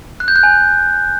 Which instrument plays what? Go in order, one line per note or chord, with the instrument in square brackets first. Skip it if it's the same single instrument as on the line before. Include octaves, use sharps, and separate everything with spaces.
[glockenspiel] F#6
G6
F#6
G#5